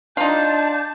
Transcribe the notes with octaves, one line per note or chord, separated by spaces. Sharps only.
D4 D#4 F4 A5 G6